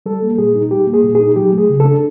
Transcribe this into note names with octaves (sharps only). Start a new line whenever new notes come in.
G3 A4
A#3
A#2 G#4
D#4
G3 G4
A#3
G#4
A#2
D#4 G#4
F#3 G4
A3
G#4
C#3
A4
D4